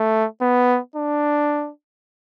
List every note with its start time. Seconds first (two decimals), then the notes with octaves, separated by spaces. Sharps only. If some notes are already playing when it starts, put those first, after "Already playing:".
Already playing: A3
0.42 B3
0.96 D4